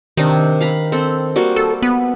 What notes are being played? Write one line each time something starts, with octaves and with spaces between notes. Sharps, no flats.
C3 D#3 D4
F5 A#5 B5
C4 A4
G3 A#3 F#4
A4
B3